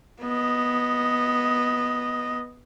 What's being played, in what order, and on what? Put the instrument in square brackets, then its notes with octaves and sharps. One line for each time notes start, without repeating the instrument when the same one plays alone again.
[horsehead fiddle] B3 D#5